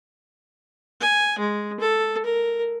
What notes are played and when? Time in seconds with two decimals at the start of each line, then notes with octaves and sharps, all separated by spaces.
1.01 G#5
1.39 G#3
1.80 A4
2.25 A#4